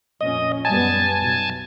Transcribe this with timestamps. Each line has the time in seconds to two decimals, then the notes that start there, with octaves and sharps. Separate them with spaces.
0.21 F2 A#2 C#4 D#5
0.65 F#2 G3 B3 G#5 A5
1.19 B1